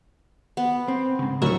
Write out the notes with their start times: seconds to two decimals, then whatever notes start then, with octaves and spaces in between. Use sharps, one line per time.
0.57 B3
0.88 C4
1.19 G#2 C#3
1.42 D2 A2 F#3 F#4 A#4 E5 C#6